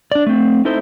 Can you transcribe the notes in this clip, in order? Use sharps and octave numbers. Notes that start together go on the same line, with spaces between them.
D4 D5
A3 C4
D#4 E4 A4 C5